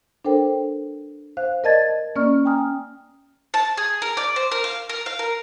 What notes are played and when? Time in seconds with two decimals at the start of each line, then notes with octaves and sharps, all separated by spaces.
0.25 D4 A4 A#4 C5 G5
1.37 C5 F5 F#6
1.64 A#4 D5 D#5 A5 G#6 A6
2.16 A#3 C#4 D5 C#6 F6
2.45 G5 G#5 A#5 D#6 F6
3.54 A5
3.77 G#4
4.02 A#4
4.17 D5
4.36 C5
4.52 A#4
4.64 F5
4.89 A#4
5.06 F5
5.19 A#4